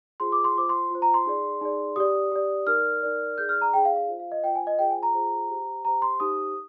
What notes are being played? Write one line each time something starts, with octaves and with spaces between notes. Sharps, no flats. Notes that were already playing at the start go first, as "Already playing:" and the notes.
F4 G#4 C5 C6
D6
C6
F4 C5 D6
C6
F4 C5
A#5
C6
D#4 G#4 D5
D#4 G#4 D5
G4 D5 D#6
G4 D5
D#4 A#4 D5 F6
D#4 A#4 D5
D#4 G#4 D5 G6
F6
A#5
D#4 G#4 D5 G5
F5
F5
F4 C5
F5
D#5
F4 C5 G5
G#5
D#5
F4 G#4 C5 G5
G#5
A#5
F4 G#4 C5
G4 C5
G4 C5 A#5
C6
D#4 G4 C5 D#6